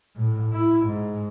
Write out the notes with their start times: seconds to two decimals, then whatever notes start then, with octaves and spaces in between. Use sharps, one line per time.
0.16 A2
0.53 E4
0.86 G#2